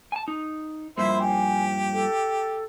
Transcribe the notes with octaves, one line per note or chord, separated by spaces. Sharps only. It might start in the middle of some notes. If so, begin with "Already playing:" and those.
G#5 A5
D#4
G2 F3 A#3 E4 C5 E5
G4 G#5
A4